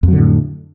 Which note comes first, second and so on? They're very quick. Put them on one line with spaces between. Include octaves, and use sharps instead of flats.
F2 F#3 D3 A2